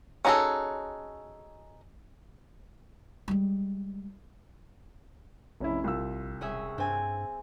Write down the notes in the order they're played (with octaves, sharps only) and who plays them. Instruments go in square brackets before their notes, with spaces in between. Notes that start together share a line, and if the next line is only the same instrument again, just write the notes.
[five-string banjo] C#4 D#4 F#4 G#4 A4
[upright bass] G3 G#3
[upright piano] F1 C#4 E4 [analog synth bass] A#1
[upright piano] C2 F4 E6
[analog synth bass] E1 [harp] C#4 G#4 E5
[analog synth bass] G2 [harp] C4 G#5